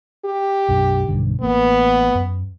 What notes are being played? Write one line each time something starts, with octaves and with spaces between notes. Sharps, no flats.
G4
B1 F#2 D4
B1 G2 D3
A1 A#3 B3
F#2